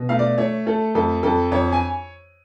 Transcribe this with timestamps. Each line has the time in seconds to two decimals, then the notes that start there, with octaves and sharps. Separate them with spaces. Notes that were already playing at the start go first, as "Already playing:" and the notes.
Already playing: B2
0.09 A3 F5
0.19 D5
0.38 A3 C#5
0.66 A3 A4
0.95 F2 A4
1.23 F2 A4
1.51 F2 C#5
1.72 G#5